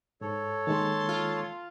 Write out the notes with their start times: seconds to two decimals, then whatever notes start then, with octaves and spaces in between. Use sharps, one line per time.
0.21 G#2 A4 C#5
0.67 D#3 G#3 A#3 A5 C6
1.09 F4